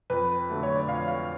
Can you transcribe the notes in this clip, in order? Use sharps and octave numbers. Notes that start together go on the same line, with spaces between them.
F2 B4
D3 F#3 A3
C#5
D5
F2 F5
F5